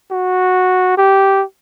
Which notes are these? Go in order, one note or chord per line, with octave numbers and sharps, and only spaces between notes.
F#4
G4